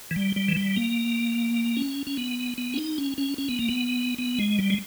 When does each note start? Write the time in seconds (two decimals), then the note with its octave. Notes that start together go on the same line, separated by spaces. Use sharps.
0.11 E3
0.16 G3
0.36 G3
0.48 E3
0.57 G3
0.76 A#3
1.77 C#4
2.07 C#4
2.17 B3
2.58 B3
2.74 C#4
2.77 D#4
2.98 C#4
3.18 C#4
3.38 C#4
3.49 B3
3.59 A#3
3.69 B3
4.18 B3
4.38 G#3
4.59 G3
4.70 G#3